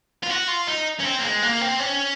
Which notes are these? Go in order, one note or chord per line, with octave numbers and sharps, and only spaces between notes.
F4
F#4
F4
D#4
C#4
C4
A#3
G#3
A#3
C4
C#4